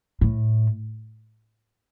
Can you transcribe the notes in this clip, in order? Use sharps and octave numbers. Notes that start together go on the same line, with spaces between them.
A2